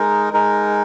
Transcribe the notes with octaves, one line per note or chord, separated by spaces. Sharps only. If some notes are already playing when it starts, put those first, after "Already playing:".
Already playing: G#3 D#4 A#4
G#3 D#4 A#4